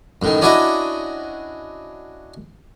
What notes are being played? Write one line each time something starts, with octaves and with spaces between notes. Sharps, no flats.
F#2 A2 D#3
C#4 D4 E4 F#4 D5 D#5